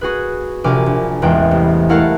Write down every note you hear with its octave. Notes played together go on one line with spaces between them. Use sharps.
F#4 G#4 B4
A#1 C3 A#4 G#5 D6
A#1
A1 E2 G#3 B4 G5
C2
A3 E4 A#4 F5 F#5 A5